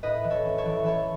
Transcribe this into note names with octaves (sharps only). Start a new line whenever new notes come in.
A2 B4 D#5
E3
A4 C#5
C#4
A4 C#5
E3
E3 A4 C#5